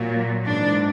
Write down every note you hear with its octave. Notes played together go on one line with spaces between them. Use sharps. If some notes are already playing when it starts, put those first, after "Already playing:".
Already playing: A#2 F#3
G#2 E3 D4